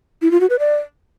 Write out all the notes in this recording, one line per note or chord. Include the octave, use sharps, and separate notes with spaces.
E4
F4
F#4
B4
D5